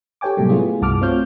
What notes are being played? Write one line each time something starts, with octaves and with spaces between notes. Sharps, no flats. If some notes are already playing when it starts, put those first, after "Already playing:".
G4 A4 C#5 G5 G#5 D6
A2 C3 F#3 G3 A3 A#3
A3 B3 E4 F4 G#4
C2 G2 F#4 A5 D6 F6
A3 C4 F4 C#5 F6 G6